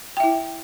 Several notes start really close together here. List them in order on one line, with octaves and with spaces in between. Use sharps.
G5 E5 E4